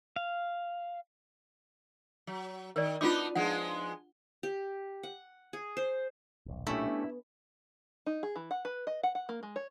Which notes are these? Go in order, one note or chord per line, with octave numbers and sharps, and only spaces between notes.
F5
F#3
D#3 A#4 D5
B3 D4 D#4 F4 F#4 D6
F3 G#3 B3 D4 F#5
G4
F#5
G#4
C5
D#1 B1
B1 A#2 A3 C#4 D4 E4 G4
B3
D#4
G#4
E3
F#5
B4
D#5
F#5
F#5
A#3
G#3
C#5